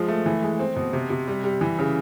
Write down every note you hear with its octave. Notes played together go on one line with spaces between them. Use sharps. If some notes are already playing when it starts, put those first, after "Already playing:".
Already playing: F3 G#3
A3
E3
G#3
C4
B2
C3
C3
G3
G3
E3
C#3